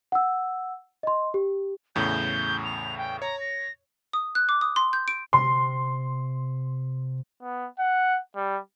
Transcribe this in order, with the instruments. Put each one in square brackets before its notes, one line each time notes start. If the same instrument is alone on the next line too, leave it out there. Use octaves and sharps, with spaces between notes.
[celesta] F#5 E6
D#5 C6
G4
[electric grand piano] E2 A2 C#3 [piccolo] G6
[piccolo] F7
G5
[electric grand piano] C#5 [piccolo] A#5
[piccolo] A#6
[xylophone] D#6
F#6
D6
D#6
C6
G6
D7
[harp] C3 [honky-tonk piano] C6
[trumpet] B3
F#5
G3